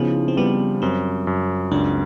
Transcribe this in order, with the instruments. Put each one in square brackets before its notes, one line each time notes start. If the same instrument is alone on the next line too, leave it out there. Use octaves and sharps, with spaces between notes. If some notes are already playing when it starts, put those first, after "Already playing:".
Already playing: [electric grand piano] C#3 F3 [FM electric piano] B3 D#4 E4
[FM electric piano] C4
[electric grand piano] G3 [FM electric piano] B3
[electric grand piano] F#2 [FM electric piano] C4
[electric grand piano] F#2
[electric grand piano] C#2 [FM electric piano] D4